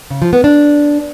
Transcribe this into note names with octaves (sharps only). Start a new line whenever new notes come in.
C#3
F3
B3
D4